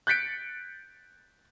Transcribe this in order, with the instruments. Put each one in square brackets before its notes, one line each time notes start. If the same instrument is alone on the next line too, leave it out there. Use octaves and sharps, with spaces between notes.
[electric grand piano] F#6 G6 A6 B6 C#7 D7